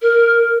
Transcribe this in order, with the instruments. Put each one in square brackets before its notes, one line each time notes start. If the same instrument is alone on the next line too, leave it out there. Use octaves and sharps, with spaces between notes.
[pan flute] A#4